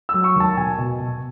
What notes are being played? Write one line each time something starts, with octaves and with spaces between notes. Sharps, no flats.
E6
F#3
C#6
D#2 A5
B2 G#5
B2
B2